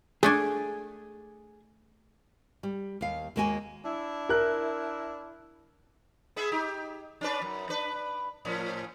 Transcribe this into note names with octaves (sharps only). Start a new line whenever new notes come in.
A3 D4 G#4 G#5
G3
D#2 F5
D#2 G#3 A#3 F#4 G5 G#5
D4 E4
A#4 F#6
B3 G#4 E5
D#4 G4
C#4 D4 B4
F#2
D4 B4
A2 F3 C#4